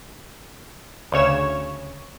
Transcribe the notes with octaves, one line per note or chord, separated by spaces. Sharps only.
D2 C#3 C#5 E7